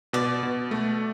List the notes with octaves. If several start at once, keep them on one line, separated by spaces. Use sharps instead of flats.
B2 D5
B2
A3